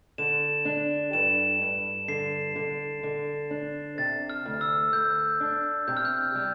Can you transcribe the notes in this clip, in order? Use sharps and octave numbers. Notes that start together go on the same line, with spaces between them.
D3 E7
D4
G2 E7
G2
D3 C7
D3
D3
D4
C3 A6
F6
D2
E6
D2 G6
D4
C3 G6
F6
G6
G3